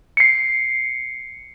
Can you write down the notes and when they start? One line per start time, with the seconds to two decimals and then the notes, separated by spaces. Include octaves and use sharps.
0.17 C7 C#7